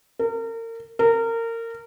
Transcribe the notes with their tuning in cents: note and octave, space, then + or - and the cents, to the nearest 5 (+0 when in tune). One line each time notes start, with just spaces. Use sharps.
A#4 -35
A#4 -25